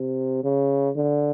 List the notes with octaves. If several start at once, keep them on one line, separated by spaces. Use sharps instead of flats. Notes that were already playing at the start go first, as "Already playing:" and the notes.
Already playing: C3
C#3
D3